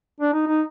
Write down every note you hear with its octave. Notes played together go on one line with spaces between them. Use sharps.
D4
D#4
D#4